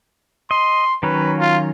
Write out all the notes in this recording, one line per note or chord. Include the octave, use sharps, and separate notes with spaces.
D#5 C6
D#3 F#3 C#4 B4
F4